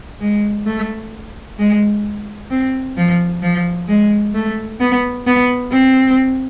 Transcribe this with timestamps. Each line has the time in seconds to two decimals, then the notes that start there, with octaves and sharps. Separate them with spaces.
0.21 G#3
0.67 A3
1.59 G#3
2.51 C4
2.97 F3
3.42 F3
3.88 G#3
4.34 A3
4.80 B3
5.26 B3
5.72 C4